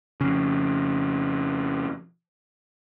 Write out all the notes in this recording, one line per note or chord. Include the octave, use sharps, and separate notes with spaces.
F2 C#3